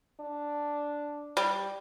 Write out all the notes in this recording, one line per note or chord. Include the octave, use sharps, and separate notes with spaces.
D4
G3